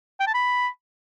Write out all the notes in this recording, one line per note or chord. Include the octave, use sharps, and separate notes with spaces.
G5
A5
B5